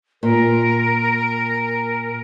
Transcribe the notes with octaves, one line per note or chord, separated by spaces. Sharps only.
A#2 A#4